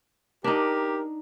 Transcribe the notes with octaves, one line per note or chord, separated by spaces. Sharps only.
D4 D#4 G4 A#4